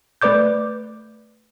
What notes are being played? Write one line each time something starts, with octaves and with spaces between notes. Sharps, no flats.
A3 B4 D5 D6 G6